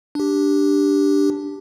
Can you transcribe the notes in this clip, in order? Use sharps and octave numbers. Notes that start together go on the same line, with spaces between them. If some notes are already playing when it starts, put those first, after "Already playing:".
D4 G4